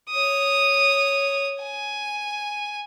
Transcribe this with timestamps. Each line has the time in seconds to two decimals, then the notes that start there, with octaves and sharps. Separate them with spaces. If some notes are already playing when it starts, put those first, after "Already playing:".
0.10 C#5 D#6
1.62 G#5